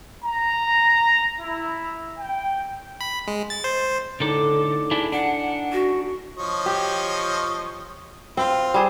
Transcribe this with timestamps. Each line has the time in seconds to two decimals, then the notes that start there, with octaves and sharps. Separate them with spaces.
0.25 A#5
1.40 E4
2.18 G5
3.01 B5
3.27 G#3
3.50 A6
3.64 C5
4.20 A2 D3 D#4 A4 D5
4.91 D4 E4 G#4 G#5
5.12 D4 F#5
5.72 F#4
6.38 F3 C#5 D#5
6.66 G4
8.37 C4 F4
8.74 G3 G#4 C5